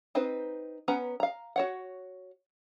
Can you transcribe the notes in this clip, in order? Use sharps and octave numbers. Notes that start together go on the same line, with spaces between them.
C4 D#4 B4 C5
B3 C#4 B4 F#5 A#5
F5 A#5
F#4 C#5 F#5